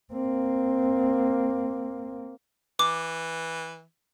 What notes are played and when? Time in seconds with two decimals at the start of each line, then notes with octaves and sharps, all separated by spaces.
0.13 A#3 C4
2.79 E3 D6